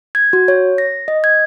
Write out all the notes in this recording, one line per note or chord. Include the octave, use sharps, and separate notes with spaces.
G#6
F#4
C#5
A#6
D#5
G#6